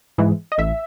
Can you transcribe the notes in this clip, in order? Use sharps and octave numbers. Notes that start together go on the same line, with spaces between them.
G#2 E3 G#3
D#5
A1 E5